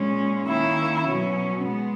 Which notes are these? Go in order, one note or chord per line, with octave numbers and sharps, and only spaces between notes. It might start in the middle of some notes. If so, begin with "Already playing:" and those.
Already playing: A#2 G#3 C#4
D#3 A#3 C#4 E4
B2 F#3 C#4
G#3 B3